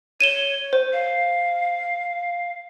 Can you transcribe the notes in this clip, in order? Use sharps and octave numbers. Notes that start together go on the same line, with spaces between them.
C#5 D#7 E7 G7
C5
F5